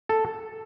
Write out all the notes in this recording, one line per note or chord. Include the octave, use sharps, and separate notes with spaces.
A4